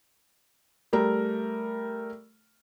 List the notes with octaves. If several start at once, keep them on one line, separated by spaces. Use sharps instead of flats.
G3 A3 A#4